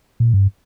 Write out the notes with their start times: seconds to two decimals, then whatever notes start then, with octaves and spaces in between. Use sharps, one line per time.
0.20 A#2
0.34 G2